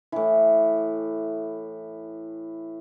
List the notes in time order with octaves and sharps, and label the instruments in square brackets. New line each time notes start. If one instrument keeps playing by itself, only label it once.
[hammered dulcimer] A2 E3